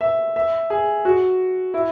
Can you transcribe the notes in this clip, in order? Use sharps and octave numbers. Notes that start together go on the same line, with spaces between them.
E5
E5
G#4
F#4
E4